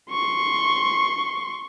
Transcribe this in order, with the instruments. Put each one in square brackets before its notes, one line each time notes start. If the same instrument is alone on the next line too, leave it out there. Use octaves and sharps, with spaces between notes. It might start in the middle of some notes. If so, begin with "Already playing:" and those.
[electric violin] C6 C#6